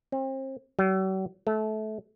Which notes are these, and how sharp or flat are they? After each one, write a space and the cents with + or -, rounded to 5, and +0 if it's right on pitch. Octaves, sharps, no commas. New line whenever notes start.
C4 +35
F#3 +45
A3 -25